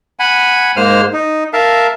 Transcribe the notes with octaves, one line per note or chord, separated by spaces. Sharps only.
F#5 G#5 B5
G#2 G#3 A#3 C5 F6
D#4
A#4 E5 F5 A5